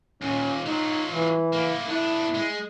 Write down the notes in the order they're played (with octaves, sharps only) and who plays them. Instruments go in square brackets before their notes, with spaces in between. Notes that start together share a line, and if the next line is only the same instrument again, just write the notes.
[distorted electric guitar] D#2 A#2 [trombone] C#4
[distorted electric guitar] F#3 F4 [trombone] D#4
[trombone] E3
[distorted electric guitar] A#3 E4
[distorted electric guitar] B3 D4 [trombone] E4
[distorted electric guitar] G#3